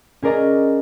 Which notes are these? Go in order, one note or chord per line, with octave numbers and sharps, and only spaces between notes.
C#4 G#4 A#4 D5 D#5 A#5